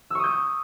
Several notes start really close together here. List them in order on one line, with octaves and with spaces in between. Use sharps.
E6 C#6 D#6 G6